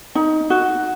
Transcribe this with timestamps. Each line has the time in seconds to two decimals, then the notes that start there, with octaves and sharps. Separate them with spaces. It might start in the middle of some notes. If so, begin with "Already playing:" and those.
0.15 D#4
0.50 F#4